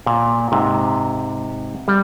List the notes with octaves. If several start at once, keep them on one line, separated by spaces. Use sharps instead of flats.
A#2
G#2 C3
G3